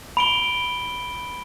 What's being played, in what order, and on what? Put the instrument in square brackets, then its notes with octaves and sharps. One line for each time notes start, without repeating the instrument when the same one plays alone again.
[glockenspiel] B5 D7 G7